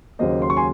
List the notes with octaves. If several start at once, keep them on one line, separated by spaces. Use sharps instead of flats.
D#2 C#3 F#3 A#3 C5 D#5
C6
C#6
G#5 C6